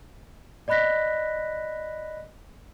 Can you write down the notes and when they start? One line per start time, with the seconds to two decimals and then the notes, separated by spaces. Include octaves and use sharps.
0.68 D5 D#5 B5 F#6 A#6 B6